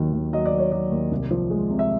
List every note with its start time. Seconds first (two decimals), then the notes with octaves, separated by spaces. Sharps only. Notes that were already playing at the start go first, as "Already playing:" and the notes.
Already playing: D#2 D#3 F#3
0.13 D#2
0.33 F#3 D#5
0.46 D5
0.52 F#3
0.58 C#5
0.72 F#3 D5
0.91 D#2
1.12 C2
1.31 F3
1.50 G#3
1.71 C3
1.79 E5